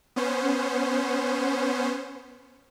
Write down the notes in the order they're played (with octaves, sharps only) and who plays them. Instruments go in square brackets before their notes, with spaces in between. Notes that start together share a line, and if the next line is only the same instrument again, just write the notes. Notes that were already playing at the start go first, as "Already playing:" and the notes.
[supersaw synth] B3 C#4 C5